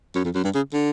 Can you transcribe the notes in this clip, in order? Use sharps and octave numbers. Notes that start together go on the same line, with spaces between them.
F#2
F2
F#2
G2
C#3
D3